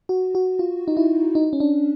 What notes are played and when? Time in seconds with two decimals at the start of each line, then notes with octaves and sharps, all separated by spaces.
0.09 F#4
0.35 F#4
0.59 F4
0.88 D#4
0.97 E4
1.35 D#4
1.53 C#4
1.60 D4